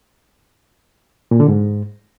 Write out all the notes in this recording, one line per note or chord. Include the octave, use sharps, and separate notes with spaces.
A#2
D3
G#2